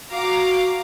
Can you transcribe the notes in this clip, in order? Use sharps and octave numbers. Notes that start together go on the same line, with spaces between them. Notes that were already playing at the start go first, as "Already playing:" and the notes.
F#4 F5 A#5 D6